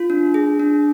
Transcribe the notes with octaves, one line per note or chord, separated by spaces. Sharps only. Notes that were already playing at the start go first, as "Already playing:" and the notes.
Already playing: F4
D4
G#4
D4